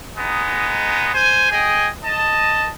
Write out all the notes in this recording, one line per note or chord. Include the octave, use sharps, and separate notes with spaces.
G#3 B3 D#4
C5 G#5
G#4 D#5 G5 G#5
D#5 A5